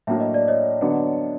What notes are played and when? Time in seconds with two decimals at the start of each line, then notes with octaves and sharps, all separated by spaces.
0.07 A2 F#3 A#3 D4 E5
0.20 D#5
0.34 D5
0.48 C#5 D#5
0.81 D3 F#3 B3 D4